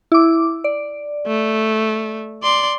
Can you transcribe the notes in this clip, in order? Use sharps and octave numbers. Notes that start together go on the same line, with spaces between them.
E4 D6
D5
A3
D5 C6